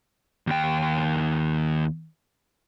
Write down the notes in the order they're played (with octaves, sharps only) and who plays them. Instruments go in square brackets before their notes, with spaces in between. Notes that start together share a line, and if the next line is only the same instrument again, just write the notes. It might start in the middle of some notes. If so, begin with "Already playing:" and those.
[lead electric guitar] D#2 G5